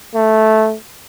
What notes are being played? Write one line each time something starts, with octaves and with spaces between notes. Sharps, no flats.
A3